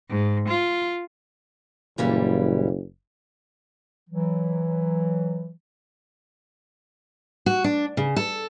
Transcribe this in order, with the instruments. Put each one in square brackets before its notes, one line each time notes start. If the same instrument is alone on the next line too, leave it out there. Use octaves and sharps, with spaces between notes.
[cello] G#2
F4
[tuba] F#1 [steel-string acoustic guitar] A#2 E3 G3
[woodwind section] E3 F#3
[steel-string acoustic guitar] F#4
D4
C#3
A4